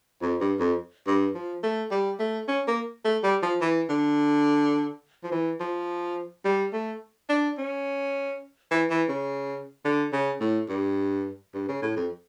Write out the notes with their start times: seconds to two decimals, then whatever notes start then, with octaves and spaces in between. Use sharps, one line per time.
0.22 F2
0.41 G2
0.59 F2
1.07 G2
1.35 F3
1.63 A3
1.92 G3
2.20 A3
2.48 C#4
2.68 A#3
3.05 A3
3.23 G3
3.43 F3
3.62 E3
3.90 D3
5.24 F3
5.32 E3
5.60 F3
6.45 G3
6.73 A3
7.30 D4
7.58 C#4
8.71 E3
8.90 E3
9.09 C#3
9.85 D3
10.13 C#3
10.41 A2
10.69 G2
11.54 G2
11.69 C#3
11.82 A2
11.97 F2